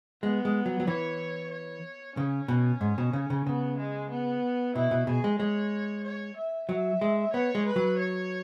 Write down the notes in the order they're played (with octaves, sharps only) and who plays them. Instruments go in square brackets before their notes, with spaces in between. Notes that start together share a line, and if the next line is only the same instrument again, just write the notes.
[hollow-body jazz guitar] G#3 [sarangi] B3
[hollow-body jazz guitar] G#3
F#3
F#3
[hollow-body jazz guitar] E3 [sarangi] C#5
[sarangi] C#5
[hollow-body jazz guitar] C#3 [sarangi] C#4
[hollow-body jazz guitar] B2
G#2
B2
C#3
C#3
[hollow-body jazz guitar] C#3 [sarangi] B3
[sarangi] G#3
B3
[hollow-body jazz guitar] B2 [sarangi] E4
[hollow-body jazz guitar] B2
[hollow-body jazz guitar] B2 [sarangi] G#4
[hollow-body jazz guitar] G#3
[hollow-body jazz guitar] G#3 [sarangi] C#5
[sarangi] C#5
E5
[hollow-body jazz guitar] F#3 [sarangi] E5
[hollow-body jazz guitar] G#3
[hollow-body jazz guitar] B3 [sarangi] C#5
[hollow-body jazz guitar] G#3
[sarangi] B4
[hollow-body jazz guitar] F#3
[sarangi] C#5